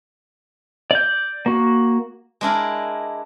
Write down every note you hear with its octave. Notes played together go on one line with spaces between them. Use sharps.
D5 G6
A#3 F#4
G#3 D4 E4 A#4